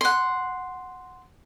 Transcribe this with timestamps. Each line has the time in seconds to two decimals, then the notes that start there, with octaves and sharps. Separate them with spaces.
0.01 F#5 C6